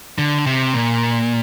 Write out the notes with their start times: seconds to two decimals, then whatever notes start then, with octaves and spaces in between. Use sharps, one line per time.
0.18 D3
0.46 C3
0.74 A#2